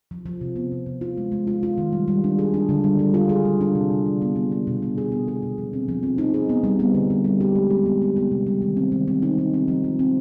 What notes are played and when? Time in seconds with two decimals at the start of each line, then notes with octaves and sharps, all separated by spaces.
0.11 F3
0.26 F3
0.41 C3
0.56 B3
0.72 C3
0.86 C3
1.01 F4
1.18 G#3
1.32 G#3
1.47 F4
1.63 F4
1.78 D#3
1.92 G3
2.08 G3
2.24 D4
2.39 G#4
2.54 D4
2.69 D3
2.84 G3
2.99 G3
3.14 F4
3.29 G#4
3.45 G3
3.61 D4
3.75 C3
3.91 C3
4.06 F3
4.22 B3
4.36 B3
4.52 B3
4.67 B2
4.82 B3
4.98 G#4
5.12 B3
5.28 G#4
5.42 B2
5.58 F3
5.73 C4
5.88 F3
6.03 C4
6.18 D#4
6.34 G#4
6.49 B3
6.64 G3
6.79 B3
6.95 D3
7.10 G3
7.24 G3
7.40 G4
7.55 G#3
7.70 G4
7.86 B3
8.02 B3
8.16 B3
8.31 C3
8.47 G3
8.62 D#3
8.77 C4
8.92 D#3
9.08 C4
9.22 D#4
9.38 D#4
9.54 C4
9.68 F3
9.84 F3
9.99 C4